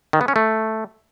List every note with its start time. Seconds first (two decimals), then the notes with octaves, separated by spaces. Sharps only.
0.13 D#3
0.21 B3
0.28 C#4
0.36 A3